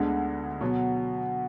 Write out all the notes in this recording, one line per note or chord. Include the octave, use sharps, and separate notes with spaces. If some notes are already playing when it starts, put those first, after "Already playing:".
Already playing: D2 D3 G#3 B3
B2 F#3 B3 F#4